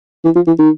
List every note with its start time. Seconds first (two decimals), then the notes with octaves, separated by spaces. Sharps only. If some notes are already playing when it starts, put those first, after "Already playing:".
0.25 E3
0.36 F3
0.47 E3
0.59 D#3